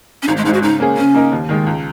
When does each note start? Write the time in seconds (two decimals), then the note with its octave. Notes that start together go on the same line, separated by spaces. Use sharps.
0.22 C#4
0.28 G#1 D#4
0.37 G#3
0.45 G#2 D#4
0.49 G#3 F#4
0.62 C#3 D#4
0.80 A#3 C#4 G#4
0.97 C#3 C#4
1.15 A#3 D#4 A#4
1.32 D#2
1.49 D#3 G#3
1.66 C#2